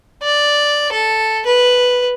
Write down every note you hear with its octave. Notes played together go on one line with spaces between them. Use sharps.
D5
A4
B4